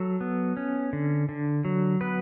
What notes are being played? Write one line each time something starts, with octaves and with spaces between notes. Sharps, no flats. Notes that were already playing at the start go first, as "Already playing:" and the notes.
Already playing: F#3 A4
B3
C#4
D3
D3
F#3
B3 B4